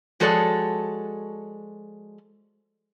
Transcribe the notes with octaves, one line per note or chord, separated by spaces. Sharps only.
F3 G#3 F#4 A4 C#5 D5